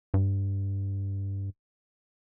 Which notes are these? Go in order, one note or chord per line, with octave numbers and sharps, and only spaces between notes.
G2